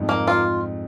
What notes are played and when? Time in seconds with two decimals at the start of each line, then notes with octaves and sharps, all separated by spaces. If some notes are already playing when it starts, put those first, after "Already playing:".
Already playing: F2 G#2
0.09 A#3
0.27 F4